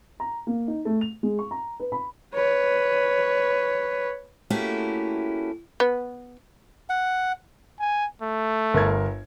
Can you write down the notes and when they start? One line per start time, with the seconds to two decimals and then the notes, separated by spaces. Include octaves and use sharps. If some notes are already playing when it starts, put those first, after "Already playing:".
0.20 A#5
0.47 A#3
0.68 D#4
0.85 A3
1.01 F7
1.23 G#3
1.39 C#6
1.51 A#5
1.80 B4
1.92 B5
2.34 B4 C#5
4.50 A3 A#3 C#4 E4 F#4 G4
5.80 B3
6.89 F#5
7.80 G#5
8.22 A3
8.74 G1 A#4 G#6